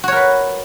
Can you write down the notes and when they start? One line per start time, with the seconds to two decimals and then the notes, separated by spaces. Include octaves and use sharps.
0.04 F#4
0.08 C#5
0.12 A#4
0.16 B4